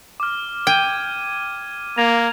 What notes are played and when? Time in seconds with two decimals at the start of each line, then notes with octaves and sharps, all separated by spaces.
0.20 D6 F6
0.67 G5 G#6 D#7
1.98 A#3 G#6 A#6 F7